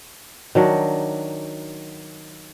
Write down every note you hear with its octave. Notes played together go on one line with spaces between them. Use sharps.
D#3 F#3 D4